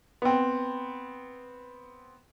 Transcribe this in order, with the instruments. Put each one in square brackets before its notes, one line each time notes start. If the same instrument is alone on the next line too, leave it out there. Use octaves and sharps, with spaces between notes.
[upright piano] B3 C4